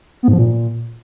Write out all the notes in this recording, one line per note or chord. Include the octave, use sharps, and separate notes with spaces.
B3
G#2
F3
A#2